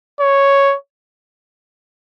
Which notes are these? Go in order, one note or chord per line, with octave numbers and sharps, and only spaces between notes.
C#5